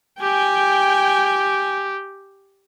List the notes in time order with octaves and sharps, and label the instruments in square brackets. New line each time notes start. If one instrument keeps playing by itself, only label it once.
[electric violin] G4 [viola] G5 G#5